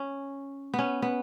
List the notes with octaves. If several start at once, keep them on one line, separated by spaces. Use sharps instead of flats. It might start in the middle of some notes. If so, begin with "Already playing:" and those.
Already playing: C#4
B3
C#4
B3